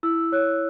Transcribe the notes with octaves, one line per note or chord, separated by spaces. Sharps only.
E4 E6
C#5 F#6